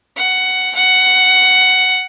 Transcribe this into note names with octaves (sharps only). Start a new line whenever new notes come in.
F#5
F#5